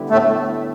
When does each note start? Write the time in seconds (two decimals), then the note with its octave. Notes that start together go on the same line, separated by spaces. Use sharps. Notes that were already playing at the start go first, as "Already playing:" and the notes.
Already playing: D3 G3 B3 E4 G4
0.10 A2 A3